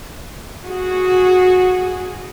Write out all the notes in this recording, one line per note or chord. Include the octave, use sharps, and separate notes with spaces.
F#4 G#4